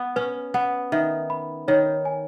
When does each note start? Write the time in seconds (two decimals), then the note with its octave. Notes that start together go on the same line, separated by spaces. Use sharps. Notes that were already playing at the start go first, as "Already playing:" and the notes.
Already playing: B3
0.16 C#4 B4
0.54 B3 F#5
0.92 D#3 E5
1.30 B5
1.68 D#3 C#5
2.05 G#5